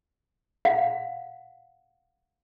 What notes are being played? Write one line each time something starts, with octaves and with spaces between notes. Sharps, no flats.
F5 F#5